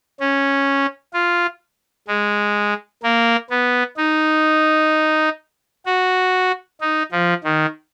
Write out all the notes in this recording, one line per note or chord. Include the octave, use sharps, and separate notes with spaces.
C#4
F4
G#3
A#3
B3
D#4
F#4
D#4
F3
D#3